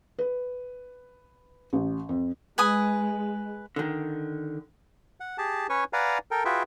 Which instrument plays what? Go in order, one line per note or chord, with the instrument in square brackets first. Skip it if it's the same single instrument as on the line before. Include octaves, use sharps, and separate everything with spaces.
[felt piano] B4
A1
F2
[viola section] G#3 [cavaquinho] B4 G#5 D#6
[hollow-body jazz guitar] D3 D#3
[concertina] F#5
G4 G#4 A5
C#4 B4 C#5 G#5 C#6
B4 D5 F5 F#5 G#5 A#5
A4 A#4 G5
F4 F#4 G#4 B4 E5 G5